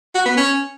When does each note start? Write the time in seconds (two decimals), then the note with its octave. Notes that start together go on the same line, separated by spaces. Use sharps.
0.15 F#4
0.26 B3
0.37 C#4